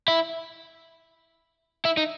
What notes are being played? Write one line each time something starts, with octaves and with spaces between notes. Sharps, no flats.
E4
E4
D#4